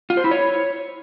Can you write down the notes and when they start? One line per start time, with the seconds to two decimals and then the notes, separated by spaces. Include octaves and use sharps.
0.10 F4
0.17 C5
0.24 E4
0.31 C#5